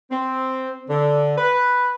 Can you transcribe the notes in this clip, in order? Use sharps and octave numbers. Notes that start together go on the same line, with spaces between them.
C4
D3
B4